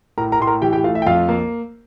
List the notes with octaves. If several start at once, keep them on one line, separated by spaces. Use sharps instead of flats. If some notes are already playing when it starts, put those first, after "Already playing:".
A2 A#4 A#5
A#4 A#5
A2 C6
A#4 A#5
E3 G4 G5
G4 G5
A3 F4 F5
E5
G5
F2 F4 F5
A#3